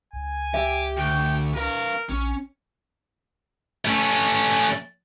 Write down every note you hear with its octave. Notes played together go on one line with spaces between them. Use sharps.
C#2 G#5
G4 E5
D2 G5
A#4 B4 F5
A#1 C#4
A3 C#4